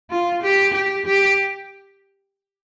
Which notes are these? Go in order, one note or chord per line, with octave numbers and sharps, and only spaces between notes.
F4
G4
G4
G4